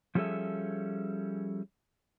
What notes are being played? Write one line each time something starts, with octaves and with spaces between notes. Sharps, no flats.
F3 G3 C#4 G#4 A4 E5